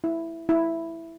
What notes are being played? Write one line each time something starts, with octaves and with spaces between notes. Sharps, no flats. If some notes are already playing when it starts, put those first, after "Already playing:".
E4
E4